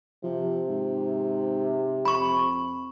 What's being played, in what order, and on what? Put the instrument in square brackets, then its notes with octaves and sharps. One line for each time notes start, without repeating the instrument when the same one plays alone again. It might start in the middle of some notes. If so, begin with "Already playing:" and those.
[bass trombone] C3 [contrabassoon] F3
[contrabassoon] G#2
[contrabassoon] F2 [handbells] B5 C#6